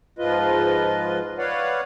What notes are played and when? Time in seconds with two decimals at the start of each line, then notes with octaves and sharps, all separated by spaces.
0.19 G#2 F3 F4 B4 D#5
1.38 B4 C#5 D5 F5 F#5